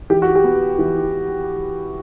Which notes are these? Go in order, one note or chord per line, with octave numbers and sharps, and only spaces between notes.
E3 G4
F#4
G4
B3
E3